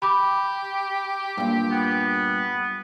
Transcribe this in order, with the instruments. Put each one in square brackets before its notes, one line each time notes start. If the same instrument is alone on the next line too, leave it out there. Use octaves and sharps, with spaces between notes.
[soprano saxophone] G4 [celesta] B5 D6
[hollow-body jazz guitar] G2 A#2
[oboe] B3